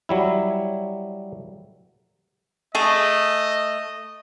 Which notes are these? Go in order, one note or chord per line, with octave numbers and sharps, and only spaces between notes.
F#3 G3 E4
A3 G#4 D#5